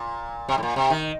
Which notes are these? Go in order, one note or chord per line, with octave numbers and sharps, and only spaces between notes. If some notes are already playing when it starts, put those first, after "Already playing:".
Already playing: A#2
C3
A2
A#2
C3
D#3